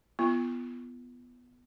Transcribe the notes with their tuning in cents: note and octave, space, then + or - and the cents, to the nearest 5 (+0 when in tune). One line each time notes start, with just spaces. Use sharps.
B3 +0 F4 -35